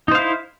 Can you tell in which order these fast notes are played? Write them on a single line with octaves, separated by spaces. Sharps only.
D#4 C5 F5 E4